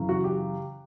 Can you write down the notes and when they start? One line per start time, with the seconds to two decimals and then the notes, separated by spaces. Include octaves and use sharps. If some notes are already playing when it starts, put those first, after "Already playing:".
Already playing: F#2 C#3 E3
0.09 F#4
0.24 G4